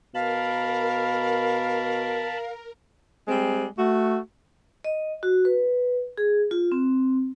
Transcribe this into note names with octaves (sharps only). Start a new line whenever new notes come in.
B2 A#4 F5 A5 B5
G3 G#3 C4
A3 F#4
D#5
F#4
B4
G#4
F4
C4